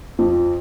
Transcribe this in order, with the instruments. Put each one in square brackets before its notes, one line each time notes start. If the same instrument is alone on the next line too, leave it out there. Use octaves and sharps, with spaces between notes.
[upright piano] F2 F3